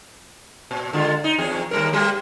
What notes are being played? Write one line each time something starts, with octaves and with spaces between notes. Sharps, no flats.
A#2
D3 G#3 F4
D#4
E2 G#4
D#2 G3 A#4
G3 G4 G#4